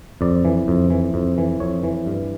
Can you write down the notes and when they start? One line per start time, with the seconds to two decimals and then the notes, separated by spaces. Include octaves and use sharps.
0.21 F2 D5
0.45 E3
0.68 F2
0.90 E3
1.14 F2
1.38 E3
1.60 F2 C#5
1.83 E3
2.06 G2